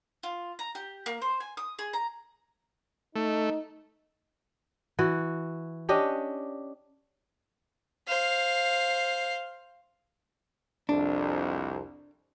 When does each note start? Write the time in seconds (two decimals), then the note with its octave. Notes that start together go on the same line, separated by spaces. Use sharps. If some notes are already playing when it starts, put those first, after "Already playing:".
0.23 F4
0.59 A#5
0.75 G4
1.06 A#3
1.22 C5
1.40 G#5
1.57 D#6
1.79 G#4
1.93 A#5
3.15 A3 D#4
4.99 E3 F#4
5.89 C#4 D4 G4 D#5
8.07 C5 F5
10.89 C2 F2 D4